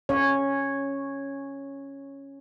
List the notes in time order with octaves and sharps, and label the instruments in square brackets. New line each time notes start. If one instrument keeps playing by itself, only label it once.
[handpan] C#4 C#5